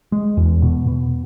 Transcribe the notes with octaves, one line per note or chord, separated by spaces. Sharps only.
G#3
E2
B2
B2